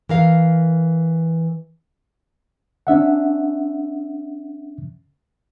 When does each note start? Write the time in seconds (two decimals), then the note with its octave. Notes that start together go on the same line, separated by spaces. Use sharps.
0.09 E3 A#4 F5
2.87 C#4 D4 E5 F#5